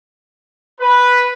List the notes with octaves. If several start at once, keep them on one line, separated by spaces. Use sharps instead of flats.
B4